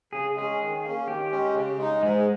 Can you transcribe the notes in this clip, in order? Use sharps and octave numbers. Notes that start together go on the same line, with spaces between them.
C#3 G#4
G#3 C#4 G#4
D#3
A#3 C#4
D#3 G4
G#3 C#4
C#3
G#3 D#4
G#2 G#3